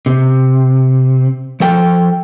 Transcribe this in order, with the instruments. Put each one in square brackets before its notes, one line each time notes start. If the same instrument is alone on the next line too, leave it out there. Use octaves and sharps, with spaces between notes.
[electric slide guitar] C3
F3 A4 G5